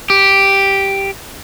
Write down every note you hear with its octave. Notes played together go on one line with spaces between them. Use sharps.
G4